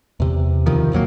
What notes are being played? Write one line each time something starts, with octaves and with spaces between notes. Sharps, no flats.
E2 C3
D2 C3 D#3 F3
A#1 F2 F#3 A#3